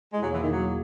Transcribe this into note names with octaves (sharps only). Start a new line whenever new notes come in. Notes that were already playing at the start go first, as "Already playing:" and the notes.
E2 B2 G#3 A#3 E4 G#4
F#3
E3
D#3
F#3